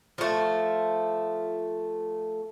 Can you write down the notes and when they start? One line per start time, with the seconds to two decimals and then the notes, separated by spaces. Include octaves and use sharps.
0.18 F3 A3